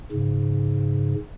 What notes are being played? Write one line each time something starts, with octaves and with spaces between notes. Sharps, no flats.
G#2 C#3